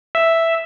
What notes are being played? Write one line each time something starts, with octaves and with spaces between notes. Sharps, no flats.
E5